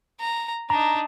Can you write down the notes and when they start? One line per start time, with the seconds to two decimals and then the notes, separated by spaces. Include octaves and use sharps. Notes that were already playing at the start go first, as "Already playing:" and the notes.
0.20 A#5
0.70 D4 D#4 A#5